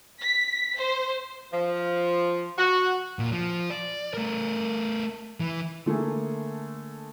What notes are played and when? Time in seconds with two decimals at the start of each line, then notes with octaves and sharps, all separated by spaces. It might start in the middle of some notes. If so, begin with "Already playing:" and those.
0.21 B6
0.78 C5
1.52 F3
2.58 F#4
3.19 A#2
3.32 F3
3.70 D5
4.14 A3 A#4
5.40 E3
5.86 D3 A3 A#3 G#4